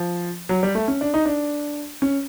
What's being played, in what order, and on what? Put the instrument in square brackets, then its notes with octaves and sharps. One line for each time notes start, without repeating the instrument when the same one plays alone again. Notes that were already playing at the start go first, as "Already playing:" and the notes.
Already playing: [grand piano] F3
F#3
G3
A3
C#4
D4
D#4
D4
C#4